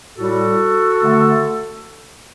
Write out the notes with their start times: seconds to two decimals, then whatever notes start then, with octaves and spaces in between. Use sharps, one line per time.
0.18 A2 G3 F#4 A4
1.02 D3 A3